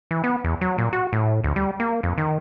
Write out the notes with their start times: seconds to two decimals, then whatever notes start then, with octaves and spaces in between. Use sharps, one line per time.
0.11 E3
0.24 B3
0.44 E2
0.61 F#3
0.78 A#2
0.93 F#4
1.13 A2
1.44 D2
1.56 G3
1.80 A#3
2.03 F2
2.18 D#3